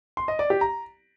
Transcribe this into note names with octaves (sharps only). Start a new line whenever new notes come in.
C6
D#5
D5
G4
A#5